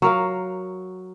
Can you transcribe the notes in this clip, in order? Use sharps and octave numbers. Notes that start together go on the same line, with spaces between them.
F#3 A#4 F5